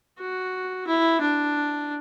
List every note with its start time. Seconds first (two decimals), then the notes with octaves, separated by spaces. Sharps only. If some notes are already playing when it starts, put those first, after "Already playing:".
0.20 F#4
0.87 E4
1.21 D4